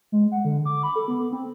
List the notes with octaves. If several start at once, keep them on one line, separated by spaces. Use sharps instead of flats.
G#3
F#5
D3
D6
B5
A4
B3
C4